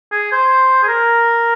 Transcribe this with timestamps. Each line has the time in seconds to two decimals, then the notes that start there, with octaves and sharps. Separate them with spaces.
0.12 G#4
0.32 C5
0.83 G#4
0.88 A#4